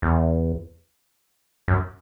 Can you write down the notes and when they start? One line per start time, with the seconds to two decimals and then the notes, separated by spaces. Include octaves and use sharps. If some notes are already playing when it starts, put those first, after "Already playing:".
0.02 E2
1.68 F#2